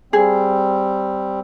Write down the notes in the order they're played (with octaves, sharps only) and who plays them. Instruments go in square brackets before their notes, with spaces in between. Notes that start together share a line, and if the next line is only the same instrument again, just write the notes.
[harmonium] G3 C4 [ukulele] G#4